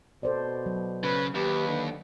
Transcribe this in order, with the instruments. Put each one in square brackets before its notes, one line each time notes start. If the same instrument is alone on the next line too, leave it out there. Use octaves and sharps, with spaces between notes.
[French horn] B2 [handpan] A4 C5 D5
[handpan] F#3
[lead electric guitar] C#3 [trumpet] B4
[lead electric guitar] D#2 [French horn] G4 [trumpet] B4
[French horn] D3